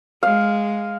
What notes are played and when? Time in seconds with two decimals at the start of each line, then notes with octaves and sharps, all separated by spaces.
0.23 G#3 F5